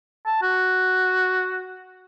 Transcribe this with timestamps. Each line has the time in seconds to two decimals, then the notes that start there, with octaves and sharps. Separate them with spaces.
0.27 A5
0.43 F#4